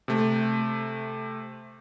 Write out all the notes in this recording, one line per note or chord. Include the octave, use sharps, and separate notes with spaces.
C3 A3